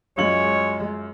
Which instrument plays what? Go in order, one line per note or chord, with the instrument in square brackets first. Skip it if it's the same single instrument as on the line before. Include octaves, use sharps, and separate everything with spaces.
[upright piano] F#2 F4 F#7 [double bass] G#3 [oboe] C#5